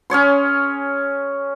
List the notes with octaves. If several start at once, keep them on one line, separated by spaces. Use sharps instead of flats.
C#4 G#4 C#5 C6